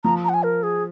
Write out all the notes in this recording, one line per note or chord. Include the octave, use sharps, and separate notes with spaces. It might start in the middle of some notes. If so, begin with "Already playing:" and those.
F3 A#5
A#5
F#5
G#5
A#4
G#4